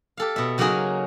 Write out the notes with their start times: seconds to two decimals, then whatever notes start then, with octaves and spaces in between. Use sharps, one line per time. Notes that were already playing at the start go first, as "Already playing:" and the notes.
0.17 G4 A4 F5
0.36 B2 E5
0.58 C#3 F#3 A#3 D#4 F#4 G#4